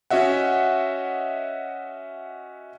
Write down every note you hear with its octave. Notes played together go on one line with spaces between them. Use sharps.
C#4 F#4 D#5 E5 F#5